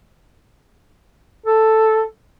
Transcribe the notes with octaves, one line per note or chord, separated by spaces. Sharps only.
A4